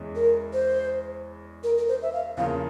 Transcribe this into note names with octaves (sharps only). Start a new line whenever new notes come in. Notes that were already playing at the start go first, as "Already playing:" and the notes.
Already playing: E2 E3 G#3 C#4
A#4
C5
A#4
A#4
C5
E5
F5
E2 C#3 F3 A#3 F5